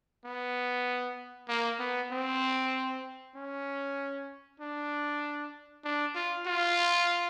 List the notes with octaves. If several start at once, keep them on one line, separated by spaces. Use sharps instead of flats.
B3
A#3
B3
C4
C#4
D4
D4
F4
F4